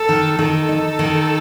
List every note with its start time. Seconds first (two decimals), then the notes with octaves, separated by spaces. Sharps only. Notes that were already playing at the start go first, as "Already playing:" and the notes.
Already playing: A4
0.09 D#3
0.38 D#3 A4
0.69 D#4
0.99 D#3